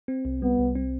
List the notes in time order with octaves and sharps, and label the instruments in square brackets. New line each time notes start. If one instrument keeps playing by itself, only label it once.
[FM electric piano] C4
C2
[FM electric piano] G3 [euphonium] B3
[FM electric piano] C2
C4